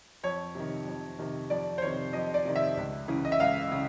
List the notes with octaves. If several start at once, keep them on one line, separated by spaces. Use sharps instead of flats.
F2 C#5
C3 D#3
F2
C3 D#3
F2 D5
C5
C3 D#3 C#5
F2 D#5
D5
C3 D#3
E5
C#2
C#3 E3
D#5
E5
C#2 F5
C#3